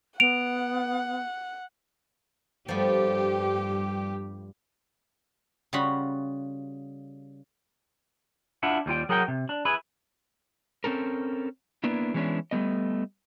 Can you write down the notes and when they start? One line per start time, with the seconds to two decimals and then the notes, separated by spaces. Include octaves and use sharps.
0.20 B3 F#5 D7 F7
2.68 G2 F3 A3 B3 G4
5.73 C#3 G3 F4 F#4 F5 B5
8.63 D4 E4 F4 E5 F#5
8.86 D#2 G3 F4 G5
9.09 F#3 G#4 A#4 F#5 G5
9.28 C3
9.49 D4
9.65 E4 G#4 B4
10.84 C4 C#4 A4 A#4
11.84 A#3 B3 D4 E4
12.14 E3 G#3 B3 C#4 D4 E4
12.51 G3 A3 B3 D#5